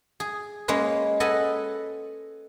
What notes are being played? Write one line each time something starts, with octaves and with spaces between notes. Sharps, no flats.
G#4
G#3 A#3 C#4 B4
A4 B4 D#5 F#5 G#5